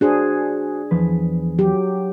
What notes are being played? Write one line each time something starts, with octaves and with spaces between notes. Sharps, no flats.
D4 F#4 G#4 C5
E2 F3 B4
F#3 G4